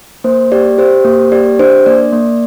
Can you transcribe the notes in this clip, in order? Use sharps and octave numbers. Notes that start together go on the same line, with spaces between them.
A#3 C5
G4 D5
G4 C5
A#3
G4 D5
D4 C5
A#3 D5
A#3